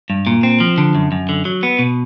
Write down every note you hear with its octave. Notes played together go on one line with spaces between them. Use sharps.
G2
A#2
C4
F3
D3
F#2
F#2
D3
F#3
B3
B2